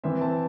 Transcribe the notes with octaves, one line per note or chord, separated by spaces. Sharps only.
E3 C4 E5
A5